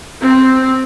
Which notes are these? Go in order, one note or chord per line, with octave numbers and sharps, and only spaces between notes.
C4